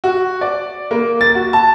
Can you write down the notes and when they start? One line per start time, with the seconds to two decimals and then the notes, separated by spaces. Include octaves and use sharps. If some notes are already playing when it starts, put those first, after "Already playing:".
0.04 F#4
0.41 D5
0.91 A#3
1.21 A6
1.35 F#4
1.53 A5